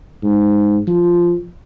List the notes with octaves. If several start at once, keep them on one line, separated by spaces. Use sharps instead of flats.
G#2
F3